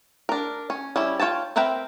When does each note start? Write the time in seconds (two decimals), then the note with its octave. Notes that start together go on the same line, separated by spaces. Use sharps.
0.29 D4 A#4
0.70 C#4
0.96 G3 C#4 E4
1.20 F4 C#5 G5 A5
1.56 C4 A#4 B4 E5 G5